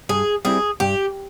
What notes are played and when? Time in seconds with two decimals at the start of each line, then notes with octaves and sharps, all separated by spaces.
0.09 G2 G#4
0.45 G3 C4 E4 G#4
0.80 G2 G4